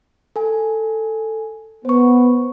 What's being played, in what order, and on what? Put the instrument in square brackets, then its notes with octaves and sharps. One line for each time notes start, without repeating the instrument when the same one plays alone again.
[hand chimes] A4 G#5
[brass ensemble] B3 [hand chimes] C5 C#6